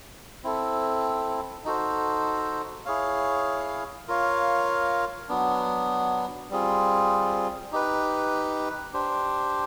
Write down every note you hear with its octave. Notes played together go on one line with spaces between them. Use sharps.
C4 E4 A4
D#4 F#4 A4 C5
E4 G#4 C#5 F5
F4 A#4 C#5 F5
F#3 B3 D4
G3 C4 F4 G#4
D#4 G4 B4
D4 G4 C5